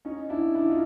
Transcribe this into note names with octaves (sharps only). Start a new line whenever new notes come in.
C#4 D#4
D#4
D4 E4
D4 E4
D#4 F4